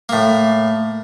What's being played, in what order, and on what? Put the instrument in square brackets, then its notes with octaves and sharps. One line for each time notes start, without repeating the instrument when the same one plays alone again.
[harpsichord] A2 A#3